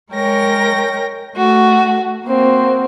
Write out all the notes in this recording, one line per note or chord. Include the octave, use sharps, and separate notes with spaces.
G#3 A#4 C#5 G5 A#6
A3 F#4
A#3 C4 F#4